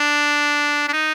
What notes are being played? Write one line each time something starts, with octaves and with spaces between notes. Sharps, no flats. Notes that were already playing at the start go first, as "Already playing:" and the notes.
Already playing: D4
D4
D#4